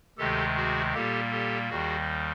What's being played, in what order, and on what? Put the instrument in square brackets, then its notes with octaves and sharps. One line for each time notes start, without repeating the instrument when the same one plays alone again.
[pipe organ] D2 C3 D#3 G#3 G4 A4
F#4 G#4
A#2 G3 A#3 G4 A4
G4 A4
D#2 D#3 G3 F#4 G#4